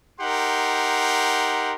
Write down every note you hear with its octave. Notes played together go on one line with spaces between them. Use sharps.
D#4 G4 A#4 F#5 C6